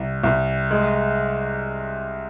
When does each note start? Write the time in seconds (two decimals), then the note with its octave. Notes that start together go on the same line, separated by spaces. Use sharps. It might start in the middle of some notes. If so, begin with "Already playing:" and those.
Already playing: C2
0.24 C2
0.71 G#3